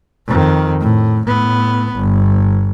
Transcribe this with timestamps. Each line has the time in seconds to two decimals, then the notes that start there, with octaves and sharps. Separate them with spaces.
0.27 F2 D#3
0.81 A2
1.27 A2 B3
1.96 G1